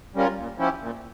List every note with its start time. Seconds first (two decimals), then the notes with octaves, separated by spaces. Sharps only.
0.15 G3 C#4 F4 A#4
0.38 A#2
0.58 F3 C#4 E4 G4
0.81 A#2